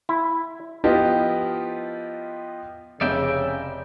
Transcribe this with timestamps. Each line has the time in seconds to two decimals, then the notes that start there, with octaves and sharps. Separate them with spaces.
0.09 E4
0.84 F3 B3 E4 F4 G4 D#5
3.01 F1 C#3 D5 E5 G5